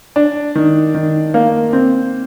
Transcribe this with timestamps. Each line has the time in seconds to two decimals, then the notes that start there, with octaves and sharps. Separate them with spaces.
0.16 D4
0.55 D#3
0.95 D#3
1.34 A#3
1.73 C4